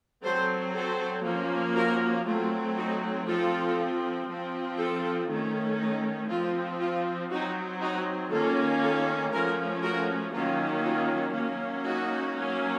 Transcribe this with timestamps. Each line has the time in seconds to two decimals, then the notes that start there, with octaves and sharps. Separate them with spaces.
0.24 F#3 C4 A4 C5
0.74 A4 C5
1.25 F3 A#3 C#4
1.75 F#4 A#4
2.25 F#3 A3 C4 F4
2.76 D#4 F#4
3.27 F3 C4 F4 A4
4.27 F3 C4
4.78 F4 A4
5.28 D#3 A3 C#4
5.79 D#4
6.29 F3 C4 F4
6.80 F4
7.30 F#3 C4 D#4 F#4
7.81 D#4 F#4
8.31 D#3 A#3 C#4 F4 A4
8.82 F4 A4
9.32 F3 A3 C#4 F#4 A#4
9.83 F#4 A#4
10.33 D#3 F#3 A#3 C#4 F4
10.83 F4
11.34 F#3 A#3 C#4
11.84 D#4 F#4
12.36 F#3 A#3 C#4